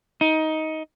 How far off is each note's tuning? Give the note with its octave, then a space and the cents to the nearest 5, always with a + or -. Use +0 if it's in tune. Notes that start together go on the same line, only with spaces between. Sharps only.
D#4 +15